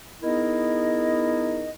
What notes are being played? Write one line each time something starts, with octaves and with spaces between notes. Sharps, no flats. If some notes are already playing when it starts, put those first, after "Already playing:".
B3 D#4 E4 G#4 A#4 D#5